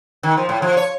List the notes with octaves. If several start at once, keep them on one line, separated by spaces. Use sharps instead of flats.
D#3
F3
A2
F3
C#5